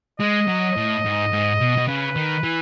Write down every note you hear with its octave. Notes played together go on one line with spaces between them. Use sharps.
G#3 D#5
F#3
A2
G#2
G#2
B2
B2
C#3 B4
D#3
E3